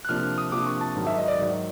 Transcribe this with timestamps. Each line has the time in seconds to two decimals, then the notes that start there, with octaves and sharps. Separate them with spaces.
0.05 F#6
0.09 C3 F3 A#3 D4 F6
0.38 D#6
0.52 C3 F3 A#3 D4 D6
0.66 C#6
0.81 A5
0.96 G#2 D#3 F#3
1.07 E5
1.18 D#5
1.28 D5
1.39 G#2 D#3 F#3